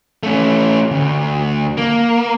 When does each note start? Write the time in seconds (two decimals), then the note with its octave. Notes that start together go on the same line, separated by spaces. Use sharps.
0.23 A3 C#4
0.91 D2
1.77 A#3